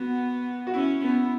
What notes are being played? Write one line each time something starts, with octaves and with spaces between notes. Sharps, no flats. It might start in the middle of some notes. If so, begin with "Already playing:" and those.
Already playing: B3 F#4
F#4
C#4 E4
B3